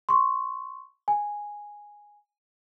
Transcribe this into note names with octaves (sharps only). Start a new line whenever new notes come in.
C6 C#6
G#5